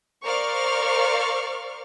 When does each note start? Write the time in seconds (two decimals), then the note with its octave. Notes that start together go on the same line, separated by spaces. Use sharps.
0.24 A#4 C5 D5 F5 C#6 F6